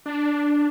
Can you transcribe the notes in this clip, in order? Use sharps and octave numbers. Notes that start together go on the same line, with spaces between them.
D4